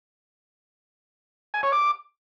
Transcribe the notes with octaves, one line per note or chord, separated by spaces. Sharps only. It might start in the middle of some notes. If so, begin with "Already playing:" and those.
G#5
C#5
D6